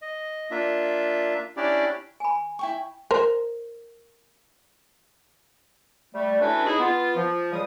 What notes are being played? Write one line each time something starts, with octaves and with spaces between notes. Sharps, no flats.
D#5
A#3 D4 F4 E5
C#4 D4 E4 G4 D5
G#5 B5
E4 G5 C#6
A#4 C5
G3 A3
A3 C#4 D4 E4 F#4 B4
D#4 E4 G#4
B3 F4
F3
C#2 G3 D#6